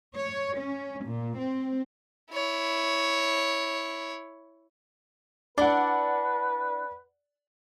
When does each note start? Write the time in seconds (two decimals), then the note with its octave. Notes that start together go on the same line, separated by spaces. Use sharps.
0.15 C#5
0.57 C#4
1.05 A#2
1.38 C4
2.32 E4 C#5
5.58 D4 E4 B4 D5 F#5